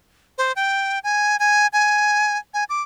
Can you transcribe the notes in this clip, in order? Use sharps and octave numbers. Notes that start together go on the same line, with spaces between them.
C5
G5
G#5
G#5
G#5
G#5
D6